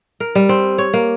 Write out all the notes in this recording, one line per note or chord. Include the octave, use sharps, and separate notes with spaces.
A#4
G3
C4
C#5
A#3